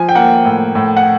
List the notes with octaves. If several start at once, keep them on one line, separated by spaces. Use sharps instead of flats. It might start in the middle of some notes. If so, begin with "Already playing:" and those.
Already playing: F3 G#5
G5
A#3 F#5
A2
A2
F#5